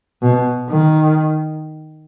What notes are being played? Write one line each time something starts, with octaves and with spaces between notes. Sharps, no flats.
B2
D#3